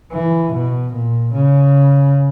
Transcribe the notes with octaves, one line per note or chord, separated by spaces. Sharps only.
E3
B2
A#2
C#3